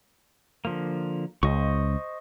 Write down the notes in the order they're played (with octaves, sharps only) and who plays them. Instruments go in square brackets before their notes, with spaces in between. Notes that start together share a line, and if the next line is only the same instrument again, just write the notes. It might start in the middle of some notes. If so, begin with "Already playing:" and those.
[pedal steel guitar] D3 F3 A#3
[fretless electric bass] C#2 [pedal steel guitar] C5 D#5 C#6